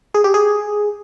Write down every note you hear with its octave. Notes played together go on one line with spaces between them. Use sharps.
G#4
G4
G#4